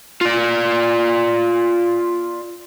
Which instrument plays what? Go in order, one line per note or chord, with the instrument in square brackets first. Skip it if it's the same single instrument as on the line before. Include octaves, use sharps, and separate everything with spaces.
[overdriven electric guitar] F4 D5